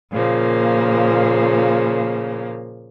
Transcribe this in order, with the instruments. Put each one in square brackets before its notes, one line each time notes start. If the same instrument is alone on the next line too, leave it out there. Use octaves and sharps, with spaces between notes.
[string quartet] A#2 C#3 F3 A#3